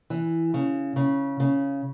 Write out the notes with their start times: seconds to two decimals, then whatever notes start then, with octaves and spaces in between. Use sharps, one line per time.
0.10 E3
0.54 C#3
0.96 C#3
1.40 C#3